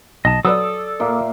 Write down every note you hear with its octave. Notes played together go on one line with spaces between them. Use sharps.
B1 D#5 A5
F#3 A4 B4 D5 D#6 E6
A#2 A#3 E5